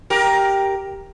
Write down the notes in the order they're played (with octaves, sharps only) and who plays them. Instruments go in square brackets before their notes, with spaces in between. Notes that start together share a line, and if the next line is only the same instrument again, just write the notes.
[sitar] G4 A#4